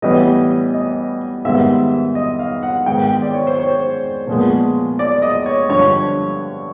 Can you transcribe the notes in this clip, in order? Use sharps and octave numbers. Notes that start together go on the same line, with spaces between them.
A2 E3 G3 B3 D#5
D#5
G#2 D#3 G3 B3 E5
D#5
F5
F#5
G#2 D#3 G#3 B3 G5
D5
C#5
C5
C#5
A#2 F3 G#3 B3
D5
D5
D#5
C#5
G2 D3 F3 C#5